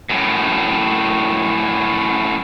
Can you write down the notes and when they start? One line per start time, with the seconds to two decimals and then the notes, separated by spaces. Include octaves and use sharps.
0.09 F#2 A2